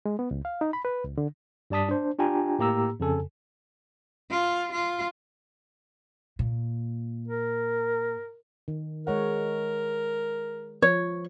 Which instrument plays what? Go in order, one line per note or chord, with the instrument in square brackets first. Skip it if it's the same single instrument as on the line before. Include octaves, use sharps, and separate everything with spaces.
[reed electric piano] G#3
B3
C#2
F5
D#4
B5
B4
C#2
D3
[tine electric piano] G2 G3 D5 A5 D#6 B6
D4 C5
D4 F4 G4 G5 G#5 A#5
A2 A#3 G4 A#5 E6
F2 C#3 A4 G#5
[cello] F4
F4
[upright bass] A#2
[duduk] A#4
[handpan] D#3
[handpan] G#3 C#5 F#5 [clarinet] A#4
[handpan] F3 [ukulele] C#5